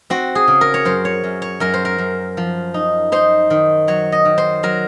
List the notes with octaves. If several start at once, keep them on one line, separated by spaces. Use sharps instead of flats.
C4 F#4
G#4
C#3
A#4
C#5
F#2 C5
C#5
F#2
C#5
F#2 A#4
C5
A#4
F#2
F3
D#4
D#4 C5
D#3
F#3 C#5
D#5
D#3
C5
F#3 A#4